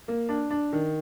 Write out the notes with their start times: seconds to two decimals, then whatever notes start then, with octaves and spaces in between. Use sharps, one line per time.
0.08 A#3
0.29 D4
0.51 D4
0.73 D#3